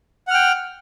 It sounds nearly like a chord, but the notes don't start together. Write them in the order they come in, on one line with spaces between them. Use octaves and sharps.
F#5 F6 G5